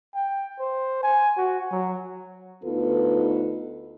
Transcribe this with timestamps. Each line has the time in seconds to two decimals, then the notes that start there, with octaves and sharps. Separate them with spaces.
0.15 G5
0.60 C5
1.03 G#5
1.38 F#4
1.72 F#3
2.64 D2 B3 D#4 F4 A4 B4